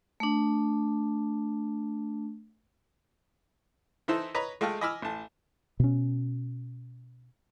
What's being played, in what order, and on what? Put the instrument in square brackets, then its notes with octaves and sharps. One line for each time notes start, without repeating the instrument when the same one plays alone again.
[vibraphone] A3 D4
[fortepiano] E3 D#4 E4 A4 C5
B4 C#5 D#5 A#5 B5
G#3 A3 F4 G5 A5 F6
D#5 G#5 B5 D6 E6 F6
A1 A5
[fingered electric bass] B2 C#4